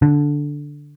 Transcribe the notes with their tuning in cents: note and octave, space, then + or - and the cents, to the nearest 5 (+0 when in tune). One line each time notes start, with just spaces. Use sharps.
D3 -5